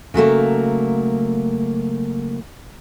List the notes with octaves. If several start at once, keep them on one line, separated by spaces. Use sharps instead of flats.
C#3 F#3 A3 A#3